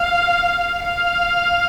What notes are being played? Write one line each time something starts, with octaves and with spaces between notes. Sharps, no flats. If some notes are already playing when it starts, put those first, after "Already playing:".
Already playing: F5
F5